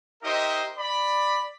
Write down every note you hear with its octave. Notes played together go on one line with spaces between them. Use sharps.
D#4 G4 A#4 C5 D#5 E5
D5 B5